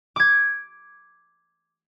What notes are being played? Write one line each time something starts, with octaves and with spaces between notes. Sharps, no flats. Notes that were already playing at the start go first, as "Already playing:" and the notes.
D6 G#6